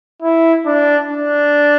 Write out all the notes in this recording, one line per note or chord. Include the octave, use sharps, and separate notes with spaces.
E4
D4
D4